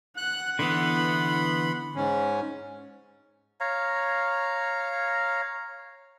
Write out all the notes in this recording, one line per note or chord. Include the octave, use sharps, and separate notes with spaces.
F#5 F#6
D3 E3 B3 B5 C6
G#2 C#4
C#5 F5 A#5